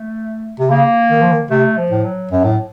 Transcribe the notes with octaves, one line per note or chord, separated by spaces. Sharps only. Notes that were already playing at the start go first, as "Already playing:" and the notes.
Already playing: A3
C3
C#3 A#3
D#3
F3
D#3
C3 A3
F3
A2
F#3
F#2 F#3
A2